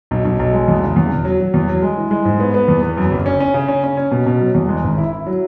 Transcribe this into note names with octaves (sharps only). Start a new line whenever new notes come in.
B1
B1
B1
G#3
E2
C#3
E2
E1
F#3
F#3
E2
F#3
G#3
E3
G#3
G#2
B3
B3
E2
B3
F#2
F#1
C#4
C#4
C#3
C#4
C#4
C#4
B2
B2
F#3
E2
G#3
G#1
E4
E4
F#3